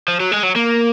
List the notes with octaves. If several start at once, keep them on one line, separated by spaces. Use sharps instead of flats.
F3
F#3
G#3
F#3
A#3